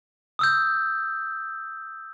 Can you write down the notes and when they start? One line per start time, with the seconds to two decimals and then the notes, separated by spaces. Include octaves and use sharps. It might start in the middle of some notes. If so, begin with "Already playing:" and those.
0.39 D#6 E6 G6